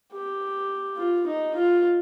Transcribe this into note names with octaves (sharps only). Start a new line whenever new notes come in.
G4
F4
D#4
F4